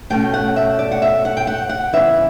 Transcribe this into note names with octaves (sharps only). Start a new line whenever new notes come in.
B2 A3 C#4 G5
F#5
E5
D5
F#5
E5
F#5
G5
F#5
F#5
C#3 E3 B3 E5